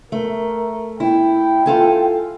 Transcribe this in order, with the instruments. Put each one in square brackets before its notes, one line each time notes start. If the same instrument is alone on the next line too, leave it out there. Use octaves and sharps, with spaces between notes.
[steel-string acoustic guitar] A3 [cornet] A#4
[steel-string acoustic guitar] E4 [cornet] G5
[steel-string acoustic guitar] F4 A4 G#5